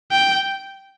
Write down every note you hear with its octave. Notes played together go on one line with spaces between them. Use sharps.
G5